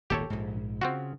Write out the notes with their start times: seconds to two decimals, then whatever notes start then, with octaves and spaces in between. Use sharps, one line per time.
0.10 D#1 G#1 A#3 G4 A4 C#5
0.30 A#1 G#2
0.81 C#3 C4 F4 F#4